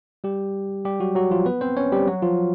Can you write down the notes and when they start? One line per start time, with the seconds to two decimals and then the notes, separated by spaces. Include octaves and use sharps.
0.24 G3 G4
0.85 G3 G4
1.00 F#3 F#4
1.15 F#3 F#4
1.31 F3 F4
1.46 B3 B4
1.61 C4 C5
1.77 C#4 C#5
1.92 G3 G4
2.07 F#3 F#4
2.22 F3 F4